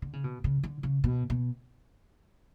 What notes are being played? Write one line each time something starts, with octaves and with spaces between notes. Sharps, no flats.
D3
C#3
B2
C#3
D3
C#3
B2
B2